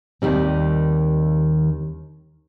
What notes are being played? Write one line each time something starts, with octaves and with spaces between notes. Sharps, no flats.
D#2 D#3 G3 C4